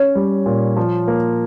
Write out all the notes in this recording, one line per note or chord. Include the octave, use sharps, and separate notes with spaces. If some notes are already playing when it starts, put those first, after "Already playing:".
Already playing: C#4 C#5
G3
A#2
F3
A#3